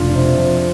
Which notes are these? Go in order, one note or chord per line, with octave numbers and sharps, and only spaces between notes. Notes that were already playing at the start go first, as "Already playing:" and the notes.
Already playing: F1 D4 F4
C3
F2